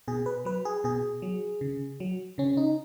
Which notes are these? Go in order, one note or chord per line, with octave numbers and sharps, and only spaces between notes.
B2 G#4
B4
F#3 B4
G#4
B2 G#4
F#3
C#3
F#3
C#3 C#4
D#4